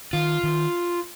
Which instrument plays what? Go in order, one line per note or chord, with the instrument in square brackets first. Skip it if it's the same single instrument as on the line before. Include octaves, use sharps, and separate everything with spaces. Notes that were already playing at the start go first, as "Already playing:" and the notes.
[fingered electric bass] D#3 [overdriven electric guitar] F4
[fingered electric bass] D#3